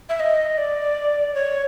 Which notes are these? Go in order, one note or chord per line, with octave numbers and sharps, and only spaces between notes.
E5
D#5
D5
C#5